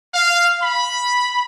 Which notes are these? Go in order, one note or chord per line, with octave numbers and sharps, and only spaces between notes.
F5
B5